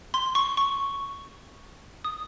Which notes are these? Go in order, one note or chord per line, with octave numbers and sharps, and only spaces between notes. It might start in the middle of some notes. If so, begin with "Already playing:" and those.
C6
C#6
C#6
D#6